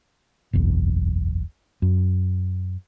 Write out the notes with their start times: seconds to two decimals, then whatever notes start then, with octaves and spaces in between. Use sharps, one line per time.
0.53 F#1 B1 E2
1.82 F#2